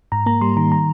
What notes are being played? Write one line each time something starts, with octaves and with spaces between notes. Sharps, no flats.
G#2 A#5
A#3 A#5
G3 C6
D#3 A#5
A#5